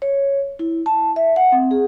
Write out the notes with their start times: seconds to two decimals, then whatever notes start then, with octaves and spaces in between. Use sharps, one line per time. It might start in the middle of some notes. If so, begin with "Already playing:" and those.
0.02 C#5
0.59 E4
0.86 A5
1.16 E5
1.36 F#5
1.52 C4
1.71 G#4